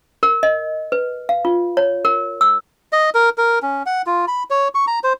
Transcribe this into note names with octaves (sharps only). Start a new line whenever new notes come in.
A#4
D#5
B4
F5
F4
C#5
A#4
E6
D#5
A#4
A#4
C#4
F#5
F4
B5
C#5
C#6
A#5
C5